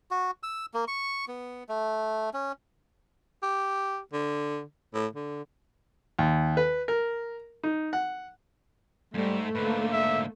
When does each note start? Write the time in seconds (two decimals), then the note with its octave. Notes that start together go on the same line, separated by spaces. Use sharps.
0.11 F#4
0.43 E6
0.74 A#3
0.88 C#6
1.28 B3
1.69 A3
2.34 C#4
3.43 G4
4.13 D3
4.94 A2
5.15 D3
6.19 D#2
6.57 B4
6.88 A#4
7.64 D#4
7.93 F#5
9.14 F2 G#2 G3 A3
9.55 G#2 D3 A#3 B4
9.92 E5